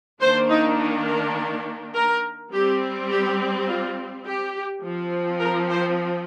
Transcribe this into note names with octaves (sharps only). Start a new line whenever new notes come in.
D#3 A#3 D4 C5
D#4
D#4
A#4
A#4
G3 C4 G4
G4
F4
G4
F3 C4
A#4
C5